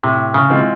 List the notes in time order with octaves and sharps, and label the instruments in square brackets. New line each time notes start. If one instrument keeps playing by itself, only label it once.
[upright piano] A2 [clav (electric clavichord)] C3
[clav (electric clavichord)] C#3
[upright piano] E3 G#3 C4 F4